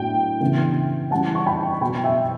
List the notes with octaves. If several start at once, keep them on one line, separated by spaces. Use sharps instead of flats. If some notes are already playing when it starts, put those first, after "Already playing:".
Already playing: A2 F#3 B3 D4 G5
C#3 E3 B3 D4
E3 G3 C#4 F#5 A5
C#6
G5 B5
B2 F#3 B3 G5 B5
E5 G5